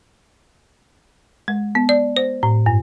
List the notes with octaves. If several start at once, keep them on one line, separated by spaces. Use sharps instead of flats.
G#3
B3
D5
C5
A2
G2